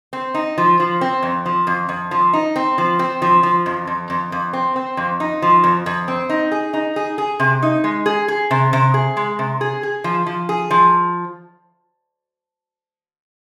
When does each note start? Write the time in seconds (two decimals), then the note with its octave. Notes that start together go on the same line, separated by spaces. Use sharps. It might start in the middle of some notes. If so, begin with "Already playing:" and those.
0.13 C4
0.34 D#4
0.58 F3
0.80 F3
1.01 C4
1.22 F2
1.46 F3
1.67 F2
1.89 F2
2.11 F3
2.33 D#4
2.56 C4
2.78 F3
2.99 C4
3.22 F3
3.43 F3
3.66 F2
3.87 F2
4.10 F2
4.32 F2
4.53 C4
4.76 C4
4.97 F2
5.20 D#4
5.42 F3
5.64 F2
5.86 F2
6.08 C4
6.29 D#4
6.51 G#4
6.73 D#4
6.96 G#4
7.18 G#4
7.40 C3
7.62 D#4
7.84 G#3
8.06 G#4
8.28 G#4
8.51 C3
8.73 C3
8.94 G#4
9.17 G#3
9.39 C3
9.61 G#4
9.83 G#4
10.04 F3
10.26 F3
10.49 G#4
10.71 F3